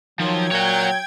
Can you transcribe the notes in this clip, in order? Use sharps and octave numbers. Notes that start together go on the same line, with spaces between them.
D#3 F3 F#3 G5 G#6
A#2 C#5 F#5